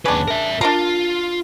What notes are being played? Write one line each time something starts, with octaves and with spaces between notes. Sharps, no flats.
D#2 C#3 D4 B4
A#4 E5
D4 F4 A#4 A#5